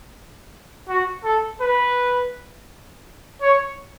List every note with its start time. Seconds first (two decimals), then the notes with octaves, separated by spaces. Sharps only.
0.88 F#4
1.24 A4
1.61 B4
3.42 C#5